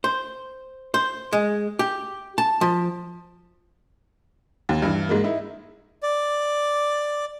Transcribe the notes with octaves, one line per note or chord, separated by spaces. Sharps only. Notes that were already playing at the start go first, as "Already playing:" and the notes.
C5
C5
G#3
G4
A5
F3
D#2
G2 E3
G#2 G#3 A#3
D#4 E4
D5